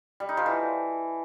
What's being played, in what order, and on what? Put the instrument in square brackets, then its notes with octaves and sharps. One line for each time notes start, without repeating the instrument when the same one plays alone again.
[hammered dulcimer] G3
D#4
F3
E3